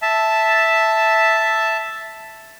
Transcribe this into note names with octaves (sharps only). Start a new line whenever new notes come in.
E5 A5